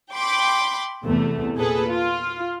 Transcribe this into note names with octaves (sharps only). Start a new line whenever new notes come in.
G5 B5 C6 D6
E2 C3 A3
A#2 G#4 A4 B4
F4